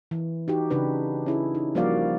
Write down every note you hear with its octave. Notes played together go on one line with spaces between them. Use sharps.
E3
D#4 F#4 G4
C#3 D4 D#4 B4
C#4 E4 G#4
D#4
F3 G3 A#3 F#4 D5 F5